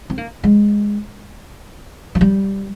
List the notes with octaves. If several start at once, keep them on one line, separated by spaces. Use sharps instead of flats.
C4
A#3
G#3
F3
G3